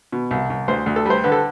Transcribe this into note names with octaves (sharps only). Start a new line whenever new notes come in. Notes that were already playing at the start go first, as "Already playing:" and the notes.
B2
C2
C2
D2 C5
D2
A4
G3 C5
D3 B4
A4